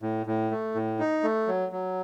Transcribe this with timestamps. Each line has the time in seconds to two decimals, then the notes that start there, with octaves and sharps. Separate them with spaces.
0.02 A2
0.26 A2
0.51 A3
0.75 A2
0.99 D#4
1.23 A3
1.48 F#3
1.72 F#3